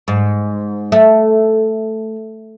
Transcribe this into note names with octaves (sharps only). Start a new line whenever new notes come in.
G#2
A3